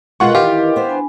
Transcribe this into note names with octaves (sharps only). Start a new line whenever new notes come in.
B2 G#3 F4 A#4 B4 D#5 F#5 C#6
D#3 E3 F4 G4
B3 C5
D4 G#5 B5